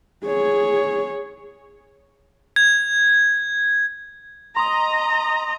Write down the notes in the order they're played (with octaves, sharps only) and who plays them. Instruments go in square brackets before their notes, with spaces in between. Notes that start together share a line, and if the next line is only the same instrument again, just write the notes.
[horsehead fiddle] G#4 C#5
[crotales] G#6
[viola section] D#5 A#5 [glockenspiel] C6 D#6